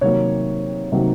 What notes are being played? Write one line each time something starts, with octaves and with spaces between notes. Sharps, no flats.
C3 D#3 F#3 A#3 C#5
C3 D#3 F#3 A#3